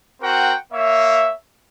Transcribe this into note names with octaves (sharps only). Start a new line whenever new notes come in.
C4 F#4 A#4 F#5 G5
A#3 C#5 E5